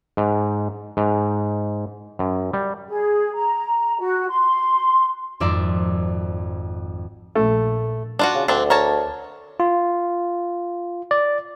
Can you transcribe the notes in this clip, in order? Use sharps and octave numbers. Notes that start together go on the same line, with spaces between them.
G#2
G#2
F#2
G3
G#4
A#5
F#4
C6
G#1 F2 D5 E5 A#5 C6
A#1 A3
D4 F4 F#4
C#3
D2 C4 D4
A#4 C#5 A5
F4
D5